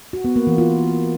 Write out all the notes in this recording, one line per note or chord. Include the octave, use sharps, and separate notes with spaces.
F#4
B3
A#3
E3
F4